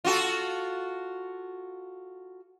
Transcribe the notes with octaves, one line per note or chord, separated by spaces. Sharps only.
F4 F#4 A4